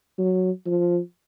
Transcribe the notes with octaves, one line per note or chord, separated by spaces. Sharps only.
F#3
F3